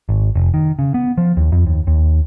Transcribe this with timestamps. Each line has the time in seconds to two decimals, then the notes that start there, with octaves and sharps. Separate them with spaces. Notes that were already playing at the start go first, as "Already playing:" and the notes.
0.09 G#1
0.36 F1
0.54 D#3
0.79 C#3
0.94 B3
1.18 F3
1.37 D#2
1.52 F2
1.67 D#2
1.87 D#2